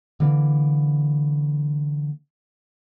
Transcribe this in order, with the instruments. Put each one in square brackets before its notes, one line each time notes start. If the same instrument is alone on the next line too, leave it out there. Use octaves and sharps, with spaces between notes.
[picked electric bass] D3 E3 A#3